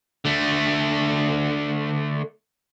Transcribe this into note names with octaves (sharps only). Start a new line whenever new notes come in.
D3 A3